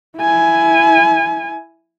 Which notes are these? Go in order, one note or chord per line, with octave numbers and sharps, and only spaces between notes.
E4 G#5